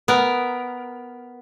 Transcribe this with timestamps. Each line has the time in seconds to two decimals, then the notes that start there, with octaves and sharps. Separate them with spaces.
0.08 B3 A#4